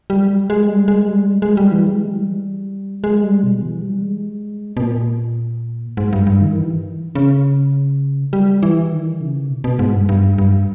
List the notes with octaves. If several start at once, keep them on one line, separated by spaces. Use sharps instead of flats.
G3
G#3
G3
G#3
G3
G#3
G#3
G3
E3
G#3
E3
G3
G#3
G3
B2
E3
G3
G#3
B2
A#2
G#2
G2
G2
D#3
E3
C#3
G3
E3
D#3
C#3
B2
B2
G#2
G2
G2
G2